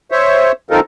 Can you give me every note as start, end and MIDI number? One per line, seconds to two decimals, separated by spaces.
0.11 0.52 72
0.11 0.52 73
0.11 0.52 76
0.71 0.80 51
0.71 0.80 60
0.71 0.80 63
0.71 0.80 65
0.71 0.80 69
0.71 0.80 70